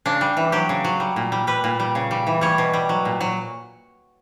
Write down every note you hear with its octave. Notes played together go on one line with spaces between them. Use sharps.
C#3 D4
G3
E3
F#3 G4
C#3
F#3
G3
A#2
G3
G3 B4
A#2
G3
C#3
G3
E3
G3 C#5
B2
G3
F#3
A#2
F#3